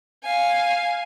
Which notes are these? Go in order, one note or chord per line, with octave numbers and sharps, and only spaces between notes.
F5 G#5